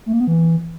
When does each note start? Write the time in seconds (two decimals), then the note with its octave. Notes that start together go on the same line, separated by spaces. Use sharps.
0.06 A3
0.13 A#3
0.20 B3
0.27 E3